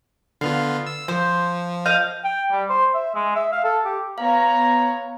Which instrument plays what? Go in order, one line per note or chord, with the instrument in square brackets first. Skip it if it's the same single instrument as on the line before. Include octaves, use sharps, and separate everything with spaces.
[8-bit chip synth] D3 B3 F4 [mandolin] F5
[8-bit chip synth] E6
[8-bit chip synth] F3 [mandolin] C5
[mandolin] D#5 F5 G6
[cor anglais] G5
G3
C5
E5
G#3
E5
F5
A4
G4
[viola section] B3 C#5 [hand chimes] F5 [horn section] A#5